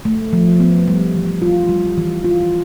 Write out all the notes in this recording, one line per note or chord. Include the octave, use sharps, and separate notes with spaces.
A3
F3
B3
G3
E3
F4
G3
E3
F4